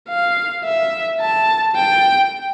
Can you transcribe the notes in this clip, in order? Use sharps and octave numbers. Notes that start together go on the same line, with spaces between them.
F5
E5
A5
G5